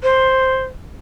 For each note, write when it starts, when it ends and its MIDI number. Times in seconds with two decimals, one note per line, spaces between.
0.03 0.64 72